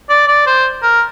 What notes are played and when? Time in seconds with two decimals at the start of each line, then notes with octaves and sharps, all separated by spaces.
0.09 D5
0.28 D5
0.46 C5
0.83 A#4